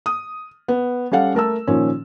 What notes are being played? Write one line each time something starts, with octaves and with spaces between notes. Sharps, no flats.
D#6
B3
G3 C#4 A4 F5 F#5
A3 A#4 A5 E6
A#2 D#3 F3 C#4